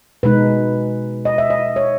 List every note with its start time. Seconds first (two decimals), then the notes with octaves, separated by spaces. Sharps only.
0.23 B2 G#3 D#4 B4
1.25 D#5
1.38 E5
1.50 D#5
1.76 C#5